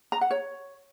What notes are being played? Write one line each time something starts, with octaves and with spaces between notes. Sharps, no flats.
A#5
F#5
C#5